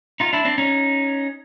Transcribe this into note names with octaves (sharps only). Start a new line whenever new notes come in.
D#4 F4
D4 E4
C4 D4
C#4 D#4